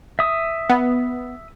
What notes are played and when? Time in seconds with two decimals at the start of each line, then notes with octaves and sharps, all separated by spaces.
0.19 E5 D#6
0.69 B3